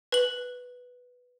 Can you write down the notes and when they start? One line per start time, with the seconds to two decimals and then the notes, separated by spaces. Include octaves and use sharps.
0.12 B4 F#7